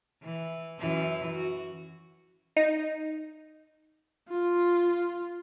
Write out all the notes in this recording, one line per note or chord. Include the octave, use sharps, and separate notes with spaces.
E3
F#2 E3 E4
F#4
D#4
F4